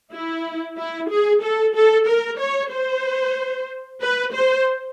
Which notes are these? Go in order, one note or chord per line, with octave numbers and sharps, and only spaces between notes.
E4
E4
G#4
A4
A4
A#4
C#5
C5
B4
C5